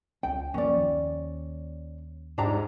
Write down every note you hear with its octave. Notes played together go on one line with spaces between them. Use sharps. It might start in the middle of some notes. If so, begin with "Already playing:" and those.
C#2 C#4 G5
F#1 F3 A#3 C#4 D5
D#2
G#2 D4 G4 A#5